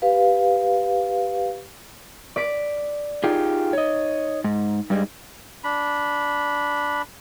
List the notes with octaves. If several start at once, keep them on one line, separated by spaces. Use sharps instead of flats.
G4 B4 F5
D5 B6 D7
D#4 F4 G4 G#4
C#5 D#5
G#2
G2 G3 G#3
D4 B5